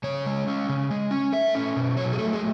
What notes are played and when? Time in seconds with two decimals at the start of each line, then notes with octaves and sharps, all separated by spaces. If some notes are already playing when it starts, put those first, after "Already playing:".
0.04 C#3 C#5
0.26 G#3
0.47 C#4
0.69 C#3
0.90 G#3
1.11 C#4
1.32 A3 E5
1.55 C#4
1.76 B2
1.97 F#3 C#5
2.13 G#4
2.19 A3 A4
2.33 G#4